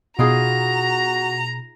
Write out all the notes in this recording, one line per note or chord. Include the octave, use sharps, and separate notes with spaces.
B2 D#4 F4 F#4 G#4 A#5